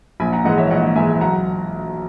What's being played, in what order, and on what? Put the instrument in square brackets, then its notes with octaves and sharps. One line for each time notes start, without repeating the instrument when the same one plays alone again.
[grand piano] A#1 [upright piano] G#5 B5
[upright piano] F#5 A#5
[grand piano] G#2 E3 G#3 [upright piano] D#5 F#5
[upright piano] C#5 E5
[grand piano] A#1 [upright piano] D#5 F#5
[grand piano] G#2 E3 G#3 [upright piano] E5 G#5
[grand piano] B1 [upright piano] F#5 A#5